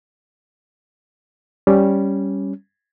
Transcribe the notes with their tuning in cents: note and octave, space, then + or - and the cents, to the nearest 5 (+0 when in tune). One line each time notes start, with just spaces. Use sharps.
G3 +0 C#4 +0